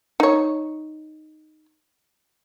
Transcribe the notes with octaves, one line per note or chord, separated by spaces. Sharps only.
D#4 C#5